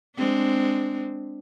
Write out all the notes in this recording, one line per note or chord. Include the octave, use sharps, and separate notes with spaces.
G#3 C4 D4